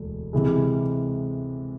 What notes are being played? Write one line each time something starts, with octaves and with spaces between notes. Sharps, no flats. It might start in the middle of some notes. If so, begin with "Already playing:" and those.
Already playing: E1 D2
C3 E3 G#3